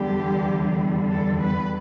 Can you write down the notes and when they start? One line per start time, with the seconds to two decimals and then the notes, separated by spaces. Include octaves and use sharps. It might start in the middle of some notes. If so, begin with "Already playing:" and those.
Already playing: E2 D3 G3 G4
1.10 A4
1.39 B4